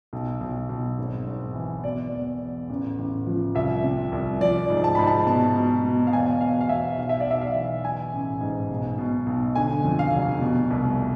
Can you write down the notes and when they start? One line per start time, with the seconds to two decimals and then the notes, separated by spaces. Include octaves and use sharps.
0.13 B1
0.41 B1
0.69 B1
0.98 G#1
1.27 G#1
1.55 E3
1.83 B2 D5
2.12 E2
2.40 E2
2.70 A1
2.99 A1
3.27 F3
3.55 C2 E5
3.84 C3
4.12 C2
4.41 F3 D5
4.70 G#2
4.84 A5
4.95 G#2 B5
5.07 A5
5.27 B2 A5
5.56 B2
5.84 B2
6.07 F5
6.13 E2 G#5
6.41 B2 F5
6.61 F5
6.69 E2 E5
6.98 B1 F5
7.09 E5
7.20 D5
7.27 B1 E5
7.41 F5
7.56 E3
7.84 E3 G#5
8.13 A1
8.41 G#2
8.70 B1
8.98 B2
9.26 B1
9.55 D3 G#5
9.84 F2
9.99 F5
10.13 F1
10.41 B2
10.71 C2